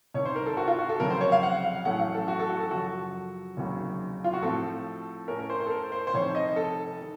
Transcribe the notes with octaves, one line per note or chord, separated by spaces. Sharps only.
C2 C3 D#3 C#5
C5
A#4
A4
F#4
F4
F#4
A4
F1 F2 C#3 F#3 A#4
C5
C#5
F5
F#5
F5
A1 A2 F#3 A3 C#4 F#5
F5
A4
F#4
A4
F#4
A4
F#2 C#3 F3 F#4
F1 D#2 C#3 F#3
F4
F#4
A2 F3 A3 C4 A4
A2 A3 C#4 A#4
A#4
C5
C5
A4
A#4
C5
C5
F1 F2 C3 D#3 C#5
D#5
A4
D#3